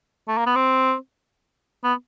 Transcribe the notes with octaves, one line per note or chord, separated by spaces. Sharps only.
A3
A#3
B3
C4
B3